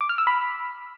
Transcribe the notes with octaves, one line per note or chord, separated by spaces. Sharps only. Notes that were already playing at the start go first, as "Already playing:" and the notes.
D6
F6
E6
B5